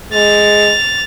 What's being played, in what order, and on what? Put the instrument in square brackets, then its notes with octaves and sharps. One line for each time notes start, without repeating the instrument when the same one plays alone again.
[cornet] G#3 [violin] A6 F7